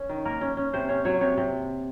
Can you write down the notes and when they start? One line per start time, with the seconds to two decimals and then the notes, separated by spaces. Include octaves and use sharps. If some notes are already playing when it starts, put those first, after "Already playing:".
Already playing: C#4
0.09 D#3
0.25 A#3 A#4
0.41 C#4
0.57 C#4
0.73 C3 C5
0.89 C#4 C#5
1.05 F#3 C#5
1.21 C3 C#5
1.37 C3